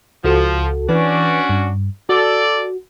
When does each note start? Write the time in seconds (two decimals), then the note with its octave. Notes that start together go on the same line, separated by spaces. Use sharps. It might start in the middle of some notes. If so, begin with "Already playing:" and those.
0.24 C#2 F3 F#4 A4
0.89 E3 C#4 D4 F#4 B4
1.49 G2
2.09 F#4 A4 D5